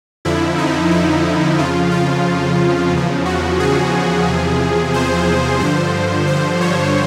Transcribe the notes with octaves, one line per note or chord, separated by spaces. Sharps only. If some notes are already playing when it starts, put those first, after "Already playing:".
F2 D3 F3 E4
D#4
E4
F2 C#3 F3 F4
F4
E2 C#3 F3
F#4
G#4
E2 C3 F3
C5
G2 D3 F3 C5
C5
C#5